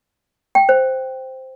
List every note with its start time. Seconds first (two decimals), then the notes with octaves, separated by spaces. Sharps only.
0.55 G5
0.69 C5